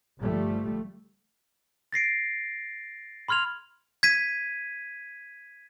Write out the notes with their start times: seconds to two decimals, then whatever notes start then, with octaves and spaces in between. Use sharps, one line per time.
0.20 G1 F3 G3 A3
1.92 A6 A#6 C7 D7
3.29 B5 C6 F6 G#6 F7
4.03 G#6 B6 D#7